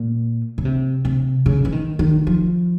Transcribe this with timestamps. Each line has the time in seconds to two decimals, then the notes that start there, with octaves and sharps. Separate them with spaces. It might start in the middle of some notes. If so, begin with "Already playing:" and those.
Already playing: A#2
0.58 C#3
0.65 C3
1.05 C3
1.46 C#3
1.65 E3
1.72 D#3
1.99 D#3
2.27 F3